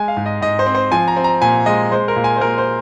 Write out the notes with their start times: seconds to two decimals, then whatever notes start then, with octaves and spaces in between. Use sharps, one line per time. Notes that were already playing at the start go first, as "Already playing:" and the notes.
Already playing: G#3 G#5
0.08 F5
0.17 G#2
0.26 D#5
0.41 G#2 D#5
0.59 C5
0.66 C4
0.75 C5
0.92 F3 G#5
1.08 A#5
1.17 C4
1.24 A#5
1.42 A#2 G#5
1.66 G#3 D#5
1.91 G#3 C5
2.08 A#4
2.16 A#2
2.24 G#5
2.37 C5
2.41 A#2 A#4
2.58 C5